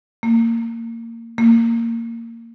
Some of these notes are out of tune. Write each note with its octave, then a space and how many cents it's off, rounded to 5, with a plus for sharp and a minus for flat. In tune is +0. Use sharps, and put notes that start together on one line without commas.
A#3 -20
A#3 -15